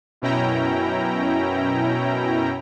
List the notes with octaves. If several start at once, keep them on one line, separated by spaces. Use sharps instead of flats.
F#2 B2 C#4 E4 G5 A#5